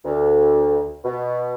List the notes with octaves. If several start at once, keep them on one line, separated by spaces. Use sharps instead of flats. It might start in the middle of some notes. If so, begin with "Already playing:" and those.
D2
B2